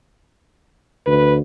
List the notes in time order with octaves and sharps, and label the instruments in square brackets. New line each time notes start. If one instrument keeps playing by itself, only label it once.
[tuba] D2 [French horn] B4